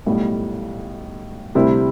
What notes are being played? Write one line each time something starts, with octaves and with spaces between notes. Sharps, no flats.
B1 A2 G3
D2 C3 G3 C4 E4